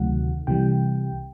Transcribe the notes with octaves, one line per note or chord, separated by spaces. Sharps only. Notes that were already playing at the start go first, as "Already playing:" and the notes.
Already playing: D2 C3 D#3 F#3 A3 F#5
C2 C3 E3 G3 G5